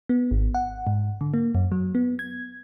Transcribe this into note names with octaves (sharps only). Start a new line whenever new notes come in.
B3
G#1
F#5
G#2
D3
A#3
F#2
F#3
B3
G#6